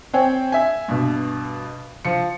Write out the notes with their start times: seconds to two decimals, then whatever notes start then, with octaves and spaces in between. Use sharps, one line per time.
0.14 C4 C5 C#5 G5 G#5
0.52 E5 G#5
0.88 G2 B2
2.05 F3 C#7